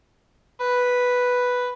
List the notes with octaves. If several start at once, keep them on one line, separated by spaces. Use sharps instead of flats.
B4